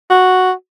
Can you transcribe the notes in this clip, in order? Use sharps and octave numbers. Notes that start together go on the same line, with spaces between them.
F#4